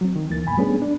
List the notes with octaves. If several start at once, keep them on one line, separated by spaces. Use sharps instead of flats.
F#3 C4
D#3
D2 E3 A#3 A6
F#2 B2 G#5 B5
G3 A3 B3 C#4 D4 G#4
D4